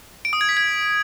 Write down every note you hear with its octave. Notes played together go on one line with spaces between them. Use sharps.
D7
D#6
G#6
B6
G#6